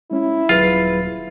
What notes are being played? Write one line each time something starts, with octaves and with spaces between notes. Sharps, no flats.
G#3 C#4 E4
D#1 F#3 F4 G#4 B4